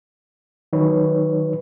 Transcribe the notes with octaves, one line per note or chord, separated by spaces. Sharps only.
D#3 F#3 D#4 B4 C#5